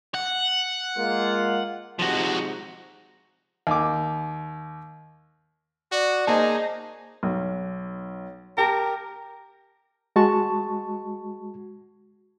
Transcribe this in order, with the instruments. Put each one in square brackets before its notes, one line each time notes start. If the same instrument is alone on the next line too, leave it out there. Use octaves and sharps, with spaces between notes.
[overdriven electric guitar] F#5
[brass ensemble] G#3 A#3 F4
[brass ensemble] C3 G#3 D#4 [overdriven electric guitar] F3 F#4
[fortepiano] D#2 D6
[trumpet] F#4 [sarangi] D5
[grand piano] A#3 C5 A5 [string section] D#4 [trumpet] G#4
[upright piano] B1
[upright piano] G4 A5 [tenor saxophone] A#4
[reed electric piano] G#3 F#4 A5 C#6